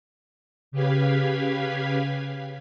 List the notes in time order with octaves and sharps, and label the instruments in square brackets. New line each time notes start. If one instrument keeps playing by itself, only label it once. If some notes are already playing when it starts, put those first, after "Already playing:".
[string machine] C#3 G4 B4 F5 G#6 B6